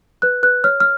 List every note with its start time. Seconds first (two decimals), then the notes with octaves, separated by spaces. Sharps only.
0.22 B4 F#6
0.43 B4 F#6
0.64 C#5 F6
0.80 F6